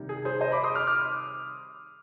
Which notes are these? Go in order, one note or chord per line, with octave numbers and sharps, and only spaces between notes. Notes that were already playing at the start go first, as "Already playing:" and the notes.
Already playing: C3 D#3 G3
G#4
G#4 C5
C5 D#5
B5 D6
C6 D#6
D6 F6
D6 F6